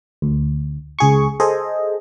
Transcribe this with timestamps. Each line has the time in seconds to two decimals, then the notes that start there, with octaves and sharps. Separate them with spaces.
0.22 D2
0.99 C#2 G#4 C#6
1.40 G#4 A4 C5 D#5